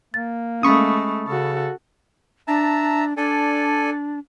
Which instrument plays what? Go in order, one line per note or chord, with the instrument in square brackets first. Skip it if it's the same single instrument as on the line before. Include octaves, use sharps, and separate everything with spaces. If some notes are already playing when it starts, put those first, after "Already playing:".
[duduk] A#3 [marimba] A6
[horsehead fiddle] G#3 A3 [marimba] C#4 [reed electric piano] B5 C#6 D#6
[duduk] C#3 [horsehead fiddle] F#4 A4
[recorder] D4 [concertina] E5 A5 A#5
[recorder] D4 [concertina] A4 D5 G#5